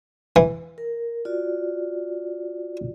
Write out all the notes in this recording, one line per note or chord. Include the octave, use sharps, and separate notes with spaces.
E3
A#4
F4 F#4 D5